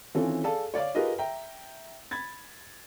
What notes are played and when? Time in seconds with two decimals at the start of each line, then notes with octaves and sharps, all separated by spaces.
0.14 D#3 E3 C4 C#4 F4 A4
0.44 G#4 A4 D5 F5 A5
0.74 C#5 D5 F5 D6
0.95 F4 G4 G#4 A#4 B4 D#5
1.18 E5 G5 A#5
2.11 B5 G#6 A6